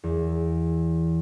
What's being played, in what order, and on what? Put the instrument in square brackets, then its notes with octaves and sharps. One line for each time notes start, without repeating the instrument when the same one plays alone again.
[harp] E2